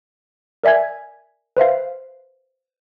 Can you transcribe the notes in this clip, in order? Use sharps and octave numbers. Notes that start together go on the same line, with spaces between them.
A#4 D5 E5 G#5 G#6
B4 C5 E5 F5